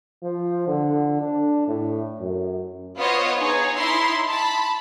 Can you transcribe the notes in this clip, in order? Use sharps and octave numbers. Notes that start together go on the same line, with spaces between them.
F3
D3
D4
A2
F#2
B3 F4 C5 C#5 D#5
D#4 G#4 C#5
D#4 E4 C6
A5 B5